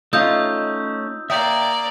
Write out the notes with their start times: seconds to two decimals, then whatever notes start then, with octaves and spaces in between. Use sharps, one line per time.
0.13 A3 C#4 D#4 F4 D#6 E6 G6
1.30 A#3 D5 E5 G5 D#6 G6